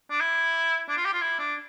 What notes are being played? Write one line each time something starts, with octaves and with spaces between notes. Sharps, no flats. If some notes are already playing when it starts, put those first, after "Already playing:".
D4
E4
D4
F4
G4
F4
E4
D4